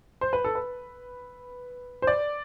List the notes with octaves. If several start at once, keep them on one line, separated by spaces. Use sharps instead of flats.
C5
B4
A4
B4
C5
D5